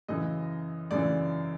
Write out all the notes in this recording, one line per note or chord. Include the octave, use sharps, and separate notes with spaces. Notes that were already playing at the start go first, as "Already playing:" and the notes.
F#2 C#3 E3 D#5
F#2 C#3 E3 D5